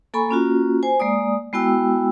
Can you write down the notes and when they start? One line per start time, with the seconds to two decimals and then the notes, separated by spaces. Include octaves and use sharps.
0.14 A#3 A4 G#5 B5 C#6
0.29 A#3 C#4 F4 F#4
0.83 C5 G#5
1.00 G#3 A#3 D5 D#6
1.53 G#3 B3 E4 F#4 G5 E6